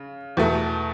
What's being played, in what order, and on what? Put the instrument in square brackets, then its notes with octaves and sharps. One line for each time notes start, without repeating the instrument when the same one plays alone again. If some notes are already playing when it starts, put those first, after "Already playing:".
Already playing: [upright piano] C#3
E2 B2 A3